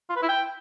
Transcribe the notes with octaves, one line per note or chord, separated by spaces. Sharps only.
F4
B4
E4
G5